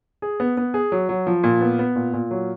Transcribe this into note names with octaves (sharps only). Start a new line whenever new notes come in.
G#4
B3
B3
G#4
F#3
F#3
F3
A#2
B3
B3
A#2
A#2
F#3